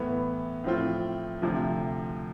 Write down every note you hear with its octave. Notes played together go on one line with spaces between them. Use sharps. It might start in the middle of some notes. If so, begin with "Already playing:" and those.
Already playing: A2 E3 B3
A2 F3 C4 F4
D2 C3 F3